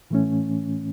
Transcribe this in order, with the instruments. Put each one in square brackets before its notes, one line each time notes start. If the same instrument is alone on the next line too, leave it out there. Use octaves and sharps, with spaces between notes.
[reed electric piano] A2 E3 A3 C#4